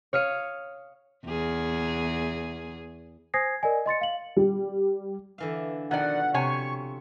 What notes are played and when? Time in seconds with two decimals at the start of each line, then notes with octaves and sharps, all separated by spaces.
0.13 C#5 F5 D#6 C#7
1.25 E2 G#4
3.34 C5 G#5 D#6 G#6 A#6 C7
3.63 A#4 D5 D#5 G#5
3.86 D#5 C6 A6 C#7
4.01 F5 F#7
4.37 G3
5.38 D3 E3 F5
5.91 B2 D#3 F3 D5 F#5
6.34 C3 C#5 G#5 C#6